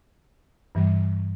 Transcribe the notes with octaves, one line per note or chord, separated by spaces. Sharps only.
G2 E3 G3